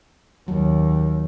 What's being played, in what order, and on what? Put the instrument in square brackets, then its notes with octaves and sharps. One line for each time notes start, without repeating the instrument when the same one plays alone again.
[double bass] D#2 [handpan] F#3